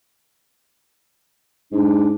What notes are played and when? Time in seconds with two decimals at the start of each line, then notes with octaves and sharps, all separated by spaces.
1.72 G#2 D4